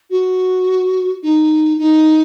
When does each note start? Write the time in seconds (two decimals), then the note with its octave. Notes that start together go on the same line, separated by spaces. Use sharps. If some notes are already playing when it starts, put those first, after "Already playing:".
0.10 F#4
1.23 D#4
1.78 D#4